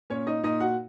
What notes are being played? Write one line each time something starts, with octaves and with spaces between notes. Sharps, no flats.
A#2 C#4 C#5
D#4 D#5
A#2 D#4 D#5
F#4 F#5